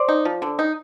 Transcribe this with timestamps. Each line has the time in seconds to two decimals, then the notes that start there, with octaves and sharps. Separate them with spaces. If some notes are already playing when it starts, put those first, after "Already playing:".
Already playing: C5 D5
0.09 D#4
0.25 F3
0.42 D3
0.59 D#4